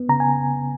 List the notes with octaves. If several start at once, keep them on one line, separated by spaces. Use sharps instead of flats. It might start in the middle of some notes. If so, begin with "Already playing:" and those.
Already playing: B3
C#3 A#5
G#5